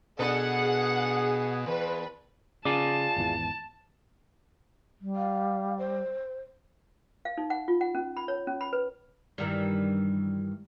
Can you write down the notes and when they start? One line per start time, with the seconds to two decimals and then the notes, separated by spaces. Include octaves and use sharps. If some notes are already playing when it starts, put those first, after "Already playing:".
0.19 B2 D4 G#4 A4 B4 F#5
1.66 E2 B4
2.65 C#3 F4 G#4 D5 A5
3.16 G#1 E2 E3
5.01 G3
5.16 F5
5.78 C5
7.25 F5
7.37 D#4
7.50 F#5
7.68 F4
7.81 F#5
7.95 C#4
8.17 B5
8.28 C#5
8.47 C#4
8.61 B5
8.73 B4
9.38 G2 D#3 E3